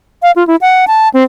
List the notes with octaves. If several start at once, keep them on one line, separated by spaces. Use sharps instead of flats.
F5
F4
E4
F#5
A5
C4